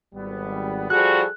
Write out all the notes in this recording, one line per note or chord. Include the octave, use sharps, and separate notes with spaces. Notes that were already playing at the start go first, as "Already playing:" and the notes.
G#1 G3 B3
F3 G3 F#4 G#4 A4 F#6